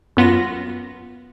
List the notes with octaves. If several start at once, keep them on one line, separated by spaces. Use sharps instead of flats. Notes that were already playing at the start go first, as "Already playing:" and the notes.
F#2 B3 F4 A#6